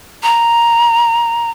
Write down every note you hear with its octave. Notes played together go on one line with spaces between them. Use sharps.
A#5